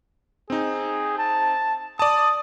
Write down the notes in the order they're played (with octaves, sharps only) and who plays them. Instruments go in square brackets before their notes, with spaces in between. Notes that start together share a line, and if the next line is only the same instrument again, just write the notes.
[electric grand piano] C4 D#4 [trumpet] G#4
[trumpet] A5
[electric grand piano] D5 A5 [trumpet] D#6